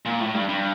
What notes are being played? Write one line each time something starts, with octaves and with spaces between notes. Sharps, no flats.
A#2
A2
G2
G2